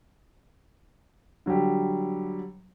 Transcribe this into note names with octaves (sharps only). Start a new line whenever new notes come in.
D3 F#3 G3 G4